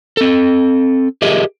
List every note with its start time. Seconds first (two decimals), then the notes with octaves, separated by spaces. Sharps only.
0.17 C4 A4
1.22 G4 G#4 A#4 D#5 E5